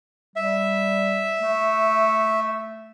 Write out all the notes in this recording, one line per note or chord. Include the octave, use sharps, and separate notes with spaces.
G3 E5
A3